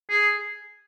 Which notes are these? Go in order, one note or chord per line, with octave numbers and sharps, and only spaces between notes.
G#4